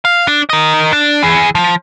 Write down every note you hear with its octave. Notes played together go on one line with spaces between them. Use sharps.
F5
D4
A#4 D#5
D4
E3 G#4
F3